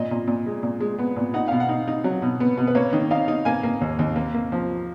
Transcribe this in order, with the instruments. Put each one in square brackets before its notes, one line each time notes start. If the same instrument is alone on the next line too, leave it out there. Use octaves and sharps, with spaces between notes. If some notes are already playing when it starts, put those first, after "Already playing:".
Already playing: [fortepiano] A#2 D#5
A#2
A#2
G#3
A#2
G#3
B3
A#2
D#4 F#5
B2 F5
F#5
D#4
D#4
F#3
B2
B3
B2
B4
A#3 C#5
D#3
D#4 F5
D#4
A#3 G#5
A#3
D#2
D#2
A#3
A#3
F3